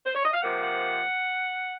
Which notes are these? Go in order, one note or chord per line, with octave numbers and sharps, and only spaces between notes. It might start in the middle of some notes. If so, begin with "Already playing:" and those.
C5
C#5
D#5
F5
C3 F3 A#3 F#5
F#5